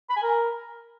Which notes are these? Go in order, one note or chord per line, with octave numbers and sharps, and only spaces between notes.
B5
G#5
A#4